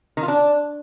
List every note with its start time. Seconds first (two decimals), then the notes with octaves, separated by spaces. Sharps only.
0.17 D#3
0.23 F4
0.28 D4